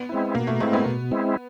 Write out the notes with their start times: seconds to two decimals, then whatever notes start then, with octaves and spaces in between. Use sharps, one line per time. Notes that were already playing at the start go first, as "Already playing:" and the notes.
Already playing: B3
0.09 G#3 C4 E4
0.35 B2 A#3
0.47 A3
0.60 G#3 A3 C4 E4
0.73 B3
0.86 B2
1.11 G#3 C4 E4